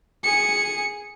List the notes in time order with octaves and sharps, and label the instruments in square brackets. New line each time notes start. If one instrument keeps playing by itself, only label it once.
[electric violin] G#4 C#7